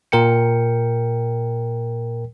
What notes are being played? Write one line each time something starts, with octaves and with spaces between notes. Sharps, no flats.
A#2 A#4 G5 C#7